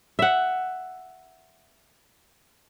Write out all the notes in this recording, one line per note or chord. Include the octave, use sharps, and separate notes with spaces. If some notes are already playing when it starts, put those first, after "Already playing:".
E5 F#5